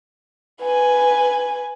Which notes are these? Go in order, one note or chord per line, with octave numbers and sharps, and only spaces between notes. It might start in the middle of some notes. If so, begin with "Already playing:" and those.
B4 G#5